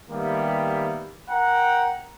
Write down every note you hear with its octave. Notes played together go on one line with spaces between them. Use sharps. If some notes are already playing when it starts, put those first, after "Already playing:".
D#3 G3 A#3 B3 G4 E5
A#4 F#5 G5 A#5